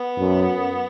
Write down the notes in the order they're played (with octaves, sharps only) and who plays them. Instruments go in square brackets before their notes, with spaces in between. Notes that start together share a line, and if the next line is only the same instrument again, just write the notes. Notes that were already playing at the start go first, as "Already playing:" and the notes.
Already playing: [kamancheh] B3
[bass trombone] F#2